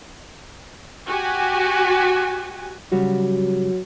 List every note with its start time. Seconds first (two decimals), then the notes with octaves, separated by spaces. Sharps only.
1.07 F#4 G4 G#5
2.92 C#3 F#3 G3 F#4